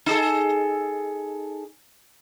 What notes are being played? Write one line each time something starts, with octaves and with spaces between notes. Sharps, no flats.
D#4 G#4 A4